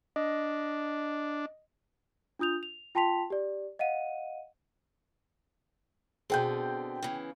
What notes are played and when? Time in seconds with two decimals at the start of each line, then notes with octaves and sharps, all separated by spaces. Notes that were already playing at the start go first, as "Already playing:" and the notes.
0.16 D4 D#5
2.39 D4 F4 D#6 G6 F7
2.63 F7
2.95 F4 G5 A5 C6 B6 F7
3.30 G4 D5
3.79 D#5 F5 F#5 D#7
6.30 B2 D3 C4 G#4 G5 G6
7.03 C#3 E3